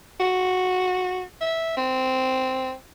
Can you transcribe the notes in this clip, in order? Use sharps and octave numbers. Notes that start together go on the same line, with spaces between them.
F#4
E5
C4